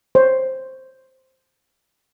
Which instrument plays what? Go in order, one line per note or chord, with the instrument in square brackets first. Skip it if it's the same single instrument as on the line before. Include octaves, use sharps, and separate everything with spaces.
[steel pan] C5 C#5